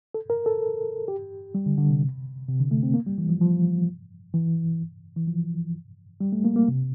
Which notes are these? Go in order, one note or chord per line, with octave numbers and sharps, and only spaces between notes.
A4
A#4
A4
G4
G3
D3
D3
C3
C3
D3
A3
C4
A#3
G3
E3
F3
F3
E3
E3
F3
G3
A3
A#3
A#3
C3